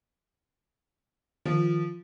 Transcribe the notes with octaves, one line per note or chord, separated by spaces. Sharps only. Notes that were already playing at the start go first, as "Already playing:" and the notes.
D#3 F3